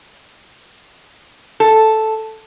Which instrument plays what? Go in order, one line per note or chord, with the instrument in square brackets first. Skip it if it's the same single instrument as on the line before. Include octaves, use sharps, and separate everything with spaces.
[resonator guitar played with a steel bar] A4